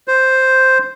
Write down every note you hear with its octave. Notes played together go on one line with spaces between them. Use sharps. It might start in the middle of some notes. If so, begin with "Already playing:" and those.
C5